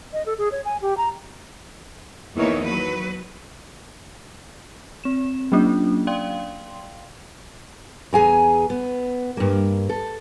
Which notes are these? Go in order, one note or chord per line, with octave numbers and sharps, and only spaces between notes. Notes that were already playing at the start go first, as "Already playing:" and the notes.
D#5
A4
G#4
C#5
G#5
G4
A#5
E2 D#3 E3 A#3 D#4 C#5
F#3 B4
C4 E7
F#3 A#3 C#4 D4 F4
D5 F5 G5 C6
E2 G#4 G#5 A#5
B3
G2 A#3
A4